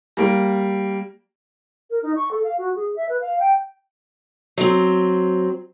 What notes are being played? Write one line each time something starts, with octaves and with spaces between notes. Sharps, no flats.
G3 A#3
A#4
D#4
C#6
A4
F5
F#4
G#4
E5
B4
F5
G5
F#3 C4